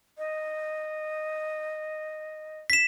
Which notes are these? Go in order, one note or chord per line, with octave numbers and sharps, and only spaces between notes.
D#5
B6 E7